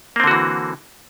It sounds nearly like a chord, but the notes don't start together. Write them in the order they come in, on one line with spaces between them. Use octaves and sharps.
A#3 C4 D3 F#4 E3